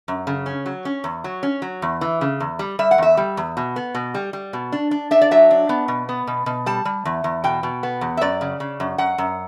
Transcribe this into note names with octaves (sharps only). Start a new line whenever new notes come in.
F#2
C#3
C#4
F#3
C#4
E2
F#3
C#4
F#3
E2
E3
C#3
E2
G3
G3 E5
F#5
E2 E5
G3
E2
B2
B3
B2
G3
G3
B2
D4
D4
D4 E5
D5
F#3 E5
D4
B3
B2
B3
B2
B2
G3 A5
G3
E2
E2
B2 G5
B2
B3
E2
E5
F#2 D5
C#3
C#3
F#2
F#2 F#5
F#2